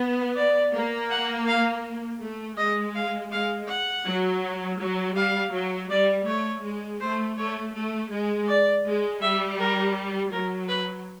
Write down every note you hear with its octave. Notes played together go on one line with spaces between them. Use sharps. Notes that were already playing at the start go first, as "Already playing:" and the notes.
Already playing: B3
D5
A#3
F#5
F5
A3
G#3 D#5
F5
G#3 F5
F#5
F#3
F#3
G3 F5
F#3
G3 D5
A3 C#5
G#3
A3 C5
A3 C#5
A3
G#3
D5
G#3
G3 E5
A#4
F#3 A#4
B4